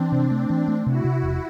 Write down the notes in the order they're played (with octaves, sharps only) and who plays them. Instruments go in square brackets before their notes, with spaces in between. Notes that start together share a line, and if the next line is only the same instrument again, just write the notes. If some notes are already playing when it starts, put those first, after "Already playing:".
Already playing: [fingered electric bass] E3 [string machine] C4 D4
[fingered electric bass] C3
A3
E3
A3
[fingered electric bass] C3 [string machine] E4 F#4
[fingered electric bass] C3
E1